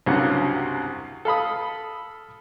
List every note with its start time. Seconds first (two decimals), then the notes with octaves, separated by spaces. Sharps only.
0.06 C2 G2 C#3 F#3 A#3 F#5
1.25 A4 F5 B5 D#6